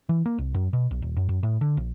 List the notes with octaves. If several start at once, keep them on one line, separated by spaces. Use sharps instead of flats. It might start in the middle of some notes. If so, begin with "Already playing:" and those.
E3
A#3
C2
F#2
B2
B1
D#1
F#2
F#2
A2
D3
A#1